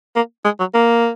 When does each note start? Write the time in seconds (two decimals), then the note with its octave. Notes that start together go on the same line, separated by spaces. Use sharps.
0.16 A#3
0.45 G#3
0.60 F#3
0.74 A#3